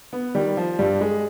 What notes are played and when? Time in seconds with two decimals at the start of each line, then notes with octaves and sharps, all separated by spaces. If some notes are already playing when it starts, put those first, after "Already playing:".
0.13 B3
0.35 D#3 G3
0.57 F3
0.79 G2 G3
1.01 G#3